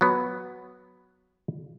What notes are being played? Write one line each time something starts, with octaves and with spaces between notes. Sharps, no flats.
F#3 B3